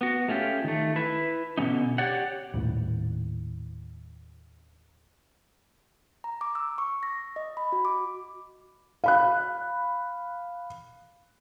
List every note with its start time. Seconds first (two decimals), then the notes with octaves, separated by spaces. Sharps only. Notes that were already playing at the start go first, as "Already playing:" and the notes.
0.01 B3 F#4
0.28 A3 C#4 F4 G4
0.64 D#3 A3
0.96 E4 B4
1.58 B2 D3 F3 C#4 D#4
1.98 G4 C#5 D5 F#5
2.54 D#1 A2
6.24 A#5
6.41 D6
6.55 E6
6.78 C#6
7.03 A#6
7.36 D#5
7.57 B5
7.72 F#4
7.85 D6
9.04 F5 B5 F#6